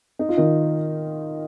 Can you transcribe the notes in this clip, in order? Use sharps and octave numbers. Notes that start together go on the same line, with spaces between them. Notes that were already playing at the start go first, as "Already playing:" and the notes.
D#4
F4
D#3 D#4